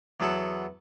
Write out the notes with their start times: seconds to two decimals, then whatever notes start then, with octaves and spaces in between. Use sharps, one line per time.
0.20 E2 F#3 B3 A4 F#5 A5